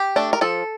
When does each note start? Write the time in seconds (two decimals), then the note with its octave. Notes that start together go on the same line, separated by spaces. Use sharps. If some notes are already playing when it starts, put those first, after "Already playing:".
Already playing: G4
0.16 A3 D4
0.33 A#4
0.41 F3 A4